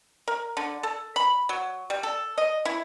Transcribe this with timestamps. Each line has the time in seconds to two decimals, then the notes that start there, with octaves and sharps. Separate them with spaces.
0.28 A#4
0.57 D3
0.83 A4
1.16 B5
1.49 F#3
1.90 G3
2.03 A4
2.38 D#5
2.65 E4